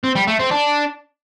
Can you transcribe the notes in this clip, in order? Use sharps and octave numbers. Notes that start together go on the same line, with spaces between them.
C4
G3
A3
C4
D4